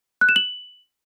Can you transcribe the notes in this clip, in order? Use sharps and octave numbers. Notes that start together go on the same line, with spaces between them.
F#6
E7
F#7